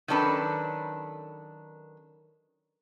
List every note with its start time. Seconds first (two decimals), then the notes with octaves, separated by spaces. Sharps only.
0.08 D#3 F#3 C#4 D4 A4 B4